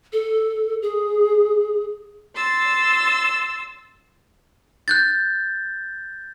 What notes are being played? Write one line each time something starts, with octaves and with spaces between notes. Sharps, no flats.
A4
G#4
C6 E6 A6
F#6 G6 A6